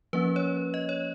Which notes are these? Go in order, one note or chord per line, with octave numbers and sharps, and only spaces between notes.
F3 A#3 C#4 B4
C#5
D#5
C#5